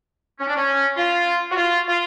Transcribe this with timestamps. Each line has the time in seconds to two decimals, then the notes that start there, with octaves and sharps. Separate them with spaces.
0.38 C#4
0.47 D4
0.55 C#4
0.97 F4
1.51 F#4
1.56 F4
1.86 F4